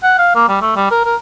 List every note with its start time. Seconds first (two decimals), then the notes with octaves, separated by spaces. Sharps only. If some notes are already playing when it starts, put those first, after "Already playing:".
0.03 F#5
0.18 F5
0.35 A#3
0.49 G3
0.62 A3
0.76 G3
0.91 A#4
1.05 A#4